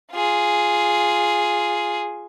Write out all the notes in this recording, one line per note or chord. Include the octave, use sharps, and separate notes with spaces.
F4 G#4